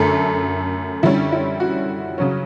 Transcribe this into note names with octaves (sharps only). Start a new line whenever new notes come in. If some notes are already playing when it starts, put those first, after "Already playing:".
Already playing: F#2 D3 A3 A4
D3 G3 C#4 E4
E4
F#4
C#3 F#3 C#4